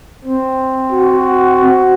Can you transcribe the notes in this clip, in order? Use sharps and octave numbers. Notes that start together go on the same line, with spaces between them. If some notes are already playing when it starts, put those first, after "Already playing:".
C4
F#4